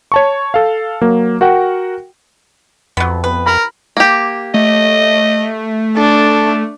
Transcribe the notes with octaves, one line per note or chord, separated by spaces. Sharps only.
C#5 A5 C#6
A4 F5
F#3 A#3
F#4 A#4 F#5 G5
F2 F#3 B3
B3 B4
A#4 B5
A#3 G4
A3 D#5
D4 A4